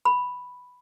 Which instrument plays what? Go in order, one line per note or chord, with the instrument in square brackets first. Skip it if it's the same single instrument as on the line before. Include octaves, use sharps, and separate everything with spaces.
[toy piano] B5